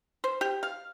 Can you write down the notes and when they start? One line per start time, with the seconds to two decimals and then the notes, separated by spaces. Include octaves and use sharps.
0.24 C5
0.41 G4
0.63 F5